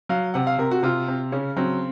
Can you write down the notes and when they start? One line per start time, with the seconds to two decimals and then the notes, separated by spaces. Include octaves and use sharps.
0.09 F#3 F5
0.34 C3 F#5
0.47 F5
0.58 C3 A#4
0.71 F#4
0.83 C3 F4
1.08 C3
1.32 C#3 C#4
1.57 F#3 C4